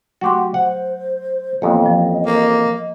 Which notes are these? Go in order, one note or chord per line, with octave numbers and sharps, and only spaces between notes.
F#3 A3 F#4 G4 C6
C5 F#5
A1 F2 A#3 B3 D#5
F3
A#3